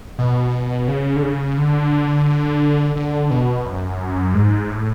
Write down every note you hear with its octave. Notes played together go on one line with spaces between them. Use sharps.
B2
C#3
D3
C#3
D3
D3
B2
F#2
G#2
A2